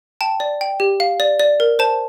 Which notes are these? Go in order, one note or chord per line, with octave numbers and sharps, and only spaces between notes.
G5 A5
D5
G5
G4
F5
D5
D5
A#4
C5 A5